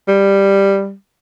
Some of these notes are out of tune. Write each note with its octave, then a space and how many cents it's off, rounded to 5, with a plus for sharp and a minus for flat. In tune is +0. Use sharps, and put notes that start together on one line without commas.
G3 +5